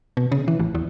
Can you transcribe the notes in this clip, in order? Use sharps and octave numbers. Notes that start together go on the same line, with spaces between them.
B2
C#3
E3
A1
E2